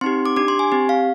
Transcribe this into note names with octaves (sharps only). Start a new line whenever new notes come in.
C4 D#4 G4 C6
D6
D4 G4 D6
C6
G#5
C4 G4
F5